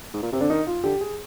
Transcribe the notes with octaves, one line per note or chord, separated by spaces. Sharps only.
G#2
A#2
C3 C4
D3 D4
D#3 D#4
F4
D3 G4
G#4